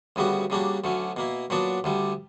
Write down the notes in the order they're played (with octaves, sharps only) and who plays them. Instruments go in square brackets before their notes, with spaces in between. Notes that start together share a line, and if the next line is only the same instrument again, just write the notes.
[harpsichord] D2 C#3 G3 B3 F#4
C#3 G3 A#3 D4 F#4
D2 D3 F#3 C#4
B2 A#3 E4
A#2 F#3 B3 D4 F#4
D2 D3 G3